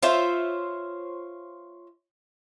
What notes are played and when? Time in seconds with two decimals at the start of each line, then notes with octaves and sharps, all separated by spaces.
0.03 F4 C5 C#5 E5